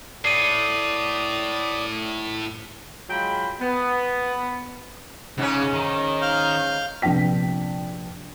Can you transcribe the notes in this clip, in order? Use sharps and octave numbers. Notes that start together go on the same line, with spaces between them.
A2 D5 D#6 C7 D#7
F#3 G#3 F4 G5 B5
B3
G#2 C#3 C#4
D#3
F5 F6 G6
A#1 C3 B3 D4 G5 B6